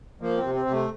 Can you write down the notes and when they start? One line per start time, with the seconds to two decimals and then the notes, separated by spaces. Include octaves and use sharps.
0.21 F3 A#3
0.37 C4
0.43 C3
0.55 C4
0.65 C3
0.72 A3